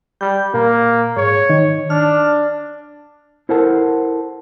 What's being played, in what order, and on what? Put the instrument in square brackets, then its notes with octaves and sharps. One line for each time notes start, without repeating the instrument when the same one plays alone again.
[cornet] G3 [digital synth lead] G6
[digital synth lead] A#2 [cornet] A#3
[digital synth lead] G#2 [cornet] C#5
[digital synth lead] D#3
[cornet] D4 [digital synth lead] F6
[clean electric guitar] E4 A4 A#4 C5 F#5 A5